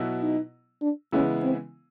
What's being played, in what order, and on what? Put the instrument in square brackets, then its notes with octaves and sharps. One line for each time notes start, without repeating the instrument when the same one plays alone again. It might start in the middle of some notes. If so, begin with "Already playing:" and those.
Already playing: [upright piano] B2 F#3 B3 E4
[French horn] D#4
D4
[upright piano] C#3 E3 G#3 B3 E4 [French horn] C#4
[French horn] C4